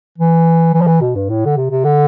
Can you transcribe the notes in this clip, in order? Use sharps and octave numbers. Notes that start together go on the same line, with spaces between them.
E3
E3
F3
E3
B2
G2
A2
D3
C3
C3
D3